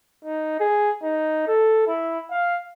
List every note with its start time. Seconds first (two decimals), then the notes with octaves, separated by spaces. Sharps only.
0.25 D#4
0.60 G#4
1.03 D#4
1.47 A4
1.87 E4
2.31 F5